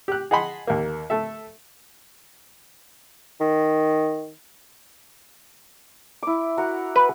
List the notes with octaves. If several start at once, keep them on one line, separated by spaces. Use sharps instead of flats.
G4 F#6
G#4 D#5 F#5 A5 B5 C6
D#2 A#3
A3 A4 E5
D#3
E4 D6
F#4 A#4 F#5
B4